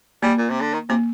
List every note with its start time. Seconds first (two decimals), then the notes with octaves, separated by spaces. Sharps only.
0.23 G3 A#3
0.38 A#2
0.50 C3
0.61 D3
0.73 D#3
0.89 C3 A#3